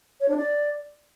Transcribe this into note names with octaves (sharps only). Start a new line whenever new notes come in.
C#5
D4
D5